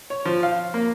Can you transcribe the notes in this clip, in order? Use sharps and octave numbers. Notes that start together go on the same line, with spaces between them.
C#5
F3
F5
A#3